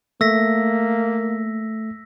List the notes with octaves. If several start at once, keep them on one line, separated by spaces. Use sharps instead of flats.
A3 A#3 E6 A#6 B6